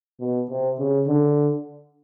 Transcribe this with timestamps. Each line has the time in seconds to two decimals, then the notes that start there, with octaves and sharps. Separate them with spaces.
0.20 B2
0.49 C3
0.79 C#3
1.07 D3